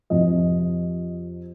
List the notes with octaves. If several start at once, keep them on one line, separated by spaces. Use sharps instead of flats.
F2 C3 F3 D#5